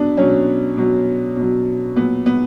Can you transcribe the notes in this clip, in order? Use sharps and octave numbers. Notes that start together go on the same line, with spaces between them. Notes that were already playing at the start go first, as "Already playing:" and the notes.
Already playing: B2 F#3 B3 D4
B2 F#3 C#4
B2 F#3
B2
F#3
A#2 F#3 B3
B3